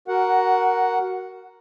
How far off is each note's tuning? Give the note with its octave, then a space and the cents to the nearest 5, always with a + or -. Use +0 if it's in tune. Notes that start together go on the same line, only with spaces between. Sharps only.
F#4 +15 A#4 +0 F#5 +0